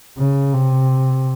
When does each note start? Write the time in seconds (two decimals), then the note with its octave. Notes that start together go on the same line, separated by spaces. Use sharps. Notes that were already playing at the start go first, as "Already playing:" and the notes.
0.18 C#3
0.53 C3